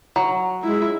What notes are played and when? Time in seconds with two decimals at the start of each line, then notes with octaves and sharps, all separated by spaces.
0.16 F#3 A#5
0.64 G#3 E4